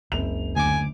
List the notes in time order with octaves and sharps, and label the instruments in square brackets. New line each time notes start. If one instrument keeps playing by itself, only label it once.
[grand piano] F#1 F7 [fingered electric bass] C#2 F3 C4
[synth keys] D2 D6 [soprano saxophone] G#5